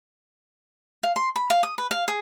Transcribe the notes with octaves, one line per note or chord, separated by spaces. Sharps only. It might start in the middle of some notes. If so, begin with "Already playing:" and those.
F5
C6
B5
F5
D#6
B4
F5
G#4